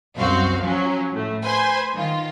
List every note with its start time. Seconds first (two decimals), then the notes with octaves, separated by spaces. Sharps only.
0.18 C2 F#2 C4 F#4 F5
0.61 F3 F#3 C#4
1.12 A2 A3
1.44 B4 C5 G#5 B5 C6
1.94 D#3 F4